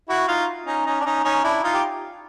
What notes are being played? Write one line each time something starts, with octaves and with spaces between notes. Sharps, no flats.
E4 F#4
D#4 F4
C#4 D#4
C#4 D#4
D4
C#4 D#4
C#4 D#4
D4 E4
D#4 F4
G4